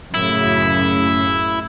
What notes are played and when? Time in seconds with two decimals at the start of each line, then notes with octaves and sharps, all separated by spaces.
0.14 F#2 A2 C#3 E4